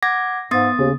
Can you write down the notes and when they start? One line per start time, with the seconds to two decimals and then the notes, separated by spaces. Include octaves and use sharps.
0.03 F#5 D6 G#6 A#6
0.51 G#2 B3 D#6 A6
0.79 D#2 C#3